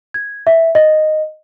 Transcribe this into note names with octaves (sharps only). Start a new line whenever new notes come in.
G#6
E5
D#5